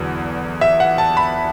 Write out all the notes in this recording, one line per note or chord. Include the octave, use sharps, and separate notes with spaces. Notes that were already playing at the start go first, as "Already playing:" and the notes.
Already playing: E2 D3 F#3
E5
F#5
A5
B5